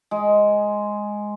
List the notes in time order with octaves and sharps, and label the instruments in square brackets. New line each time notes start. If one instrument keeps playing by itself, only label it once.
[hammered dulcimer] G#3